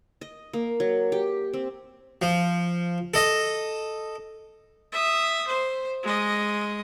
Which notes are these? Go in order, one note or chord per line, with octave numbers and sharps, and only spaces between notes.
D#5
A#3
F#3
G4
C4
F3
A4 D#5
E5 D#6
C5
G#3 D#5